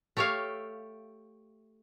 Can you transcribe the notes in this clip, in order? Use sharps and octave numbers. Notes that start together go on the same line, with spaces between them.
A3 G4 C#5 E5 F5